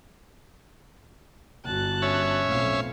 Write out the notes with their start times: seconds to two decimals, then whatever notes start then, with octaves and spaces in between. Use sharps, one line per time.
1.65 G1 F#4 A5 F#6
2.02 C#4 C#5 E5
2.47 B1 F2 A2 F5